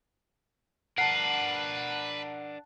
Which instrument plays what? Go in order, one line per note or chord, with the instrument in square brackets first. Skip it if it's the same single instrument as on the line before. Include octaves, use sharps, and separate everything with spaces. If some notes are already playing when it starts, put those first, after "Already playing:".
[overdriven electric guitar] D4 A#4 [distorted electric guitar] B4 [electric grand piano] F#5 A5 [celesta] C7